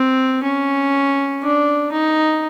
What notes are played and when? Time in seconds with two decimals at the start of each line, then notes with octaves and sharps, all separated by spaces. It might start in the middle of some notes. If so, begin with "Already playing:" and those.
Already playing: C4
0.43 C#4
1.43 D4
1.92 D#4